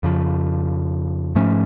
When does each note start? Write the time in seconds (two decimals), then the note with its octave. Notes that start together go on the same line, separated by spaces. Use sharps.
0.03 F2 C#3 F3
1.35 G#2 F3 A3 C#4